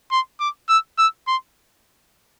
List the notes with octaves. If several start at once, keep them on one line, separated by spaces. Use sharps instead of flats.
C6
D6
E6
E6
C6